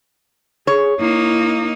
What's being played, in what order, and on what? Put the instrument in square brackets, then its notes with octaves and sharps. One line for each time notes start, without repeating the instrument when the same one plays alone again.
[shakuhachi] G#4 [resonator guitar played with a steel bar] C#5
[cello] A#3 D#4 [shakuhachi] E4